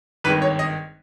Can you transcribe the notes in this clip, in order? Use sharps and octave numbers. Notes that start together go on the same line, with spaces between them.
G#1 G2 D#3 G#3 B4
C#5
D#5